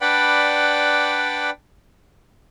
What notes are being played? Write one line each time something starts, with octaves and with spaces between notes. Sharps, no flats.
D4 B4 D5 F#5 G5 B5